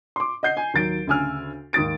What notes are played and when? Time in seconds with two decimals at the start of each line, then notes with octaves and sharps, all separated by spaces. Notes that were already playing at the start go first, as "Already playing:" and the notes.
0.16 C6 D6
0.43 D#5 F#5 G6 C7
0.57 G#5
0.74 D#2 F#3 A6 D7
1.07 D2 C#3 G#5 E6 F6
1.73 D#2 G#2 D#6 A6 D7